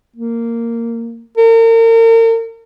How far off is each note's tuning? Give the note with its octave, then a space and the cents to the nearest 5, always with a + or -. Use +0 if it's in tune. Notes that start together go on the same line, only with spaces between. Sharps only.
A#3 -10
A#4 -40